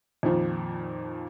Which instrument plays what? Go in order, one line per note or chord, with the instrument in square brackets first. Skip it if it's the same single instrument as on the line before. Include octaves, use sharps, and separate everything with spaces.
[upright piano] F2 A#2 D#3 F3